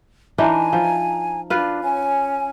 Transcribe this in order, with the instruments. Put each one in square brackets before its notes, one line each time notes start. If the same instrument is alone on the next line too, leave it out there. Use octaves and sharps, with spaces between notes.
[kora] E3 D4 D#4 [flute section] G#5 A#5
[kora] F3
[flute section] D4 [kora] F4 B4
[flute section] C#4 C#5 G#5